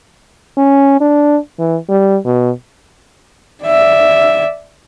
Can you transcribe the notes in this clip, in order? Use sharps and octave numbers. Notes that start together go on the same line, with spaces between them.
C#4
D4
E3
G3
B2
D5 E5